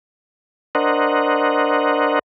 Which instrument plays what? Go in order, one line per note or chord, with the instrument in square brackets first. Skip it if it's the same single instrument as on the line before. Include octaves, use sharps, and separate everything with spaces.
[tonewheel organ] D4 A#4 C5 D#5 F#5